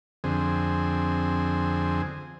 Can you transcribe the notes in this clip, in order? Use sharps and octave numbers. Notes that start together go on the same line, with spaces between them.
F2 D3 C4 G#4